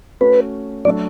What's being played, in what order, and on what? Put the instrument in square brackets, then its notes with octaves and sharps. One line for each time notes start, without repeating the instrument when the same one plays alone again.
[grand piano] A3 C#4 F#4 [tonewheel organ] B4
[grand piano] F#3 A3 D4 A4 [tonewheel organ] D5